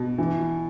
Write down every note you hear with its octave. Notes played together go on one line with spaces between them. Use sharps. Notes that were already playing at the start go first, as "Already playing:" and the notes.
Already playing: B2
E3